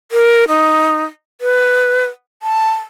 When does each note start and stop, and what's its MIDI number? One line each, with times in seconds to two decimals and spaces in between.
0.12 0.44 70
0.48 1.04 63
1.41 2.05 71
2.43 2.72 81